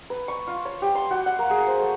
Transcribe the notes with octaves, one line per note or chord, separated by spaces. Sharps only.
B4
C#6
F4
C#5
G4
C6
F#4
F#5
A#3
G#4
C5
A3